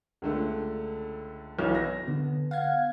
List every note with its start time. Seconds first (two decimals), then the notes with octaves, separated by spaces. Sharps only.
0.22 C#2 D3 A3
1.59 B1 E3
1.75 A#6
2.08 D3 B3
2.51 F5 F#5 G#6